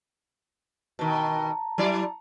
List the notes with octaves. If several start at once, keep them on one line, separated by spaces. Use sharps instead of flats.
B2 D#3 A5 A#5
F#3 E4 D5